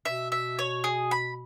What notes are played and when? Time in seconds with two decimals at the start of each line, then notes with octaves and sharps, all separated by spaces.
0.05 B2 E5
0.32 E5
0.59 C#5
0.84 G#4
1.11 B5